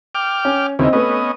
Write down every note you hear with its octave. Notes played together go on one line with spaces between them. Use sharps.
G5 D6 F6
C#4
D#2 C#3 E3 C4 D#5
A3 B3 C#4 B4 D#5